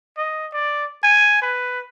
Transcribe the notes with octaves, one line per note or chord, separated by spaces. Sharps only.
D#5
D5
G#5
B4